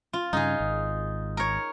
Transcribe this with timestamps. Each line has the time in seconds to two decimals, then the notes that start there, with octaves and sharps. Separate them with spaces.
0.13 F4
0.33 G2 C#3 D#4 G#4
0.60 G#1
1.37 A#4 C#5